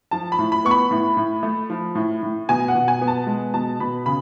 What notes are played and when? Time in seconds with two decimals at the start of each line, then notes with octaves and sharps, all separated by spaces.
0.11 F3 A5
0.32 B5
0.39 A2
0.52 B5
0.65 B3 C#6
0.71 B5
0.91 A2
1.17 A2
1.43 A3
1.70 F3
1.95 A2
2.23 A2
2.49 B2 G#5
2.68 F#5
2.75 B2
2.88 G#5
3.01 B3
3.08 A5
3.27 G#3
3.54 B2 A5
3.80 B2 B5
4.06 C#3 B5